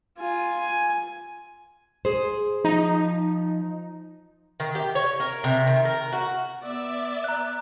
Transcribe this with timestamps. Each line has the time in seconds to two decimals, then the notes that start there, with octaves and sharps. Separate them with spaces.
0.18 F4 G#5
0.60 G#5
2.05 G#4 C5
2.65 F3 D#4
4.60 D#3
4.75 G4
4.95 C#5
5.20 A#4
5.44 C3
5.67 D#3
5.85 A#4
6.13 F#4
6.62 B3 D5 E5
7.24 A#5 F#6